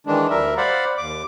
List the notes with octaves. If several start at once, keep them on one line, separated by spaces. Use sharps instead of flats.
D#3 E3 G#3 D4
D2 G3 A#4 E5
C5 D5 F5 F#5 B5
D#2 D6